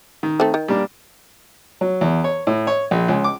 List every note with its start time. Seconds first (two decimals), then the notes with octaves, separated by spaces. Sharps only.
0.23 D#3
0.40 A3 C4
0.54 D#3
0.68 G3 A#3 D4
1.81 F#3
2.01 E2
2.24 C#5
2.47 A2
2.67 C#5
2.91 A#1
3.08 C#2
3.24 D6